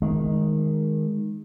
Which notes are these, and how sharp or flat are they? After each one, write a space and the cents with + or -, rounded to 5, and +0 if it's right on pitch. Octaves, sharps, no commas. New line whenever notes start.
D#3 +0 G#3 +0